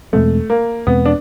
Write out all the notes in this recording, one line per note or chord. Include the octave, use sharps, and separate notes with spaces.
E2 B2 G#3 A3 C4
A#3
E2 B2 G#3 B3 C4
D4